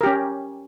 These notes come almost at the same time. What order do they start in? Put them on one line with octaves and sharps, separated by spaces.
A#4 G4 C#4